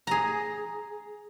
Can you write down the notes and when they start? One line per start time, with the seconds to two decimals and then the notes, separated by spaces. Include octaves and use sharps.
0.07 G#4 A#5